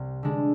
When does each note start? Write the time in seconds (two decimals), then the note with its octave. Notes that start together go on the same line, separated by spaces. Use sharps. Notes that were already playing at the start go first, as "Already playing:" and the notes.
Already playing: C2 C3 C4
0.23 D3 G#3 D4